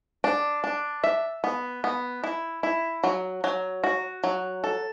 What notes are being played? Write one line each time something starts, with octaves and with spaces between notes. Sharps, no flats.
D4
D4
E5
B3
B3
E4
E4
F#3
F#3
F#4
F#3
A4